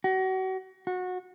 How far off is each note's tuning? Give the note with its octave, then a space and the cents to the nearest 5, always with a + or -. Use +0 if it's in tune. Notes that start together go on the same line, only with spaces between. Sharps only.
F#4 +35
F#4 -20